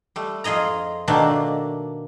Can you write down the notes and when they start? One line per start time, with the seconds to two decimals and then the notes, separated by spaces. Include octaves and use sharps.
0.16 G3 A3
0.44 F2 F4 G#4 D#5 A#5
1.08 B2 D#3 A3 A#3 D4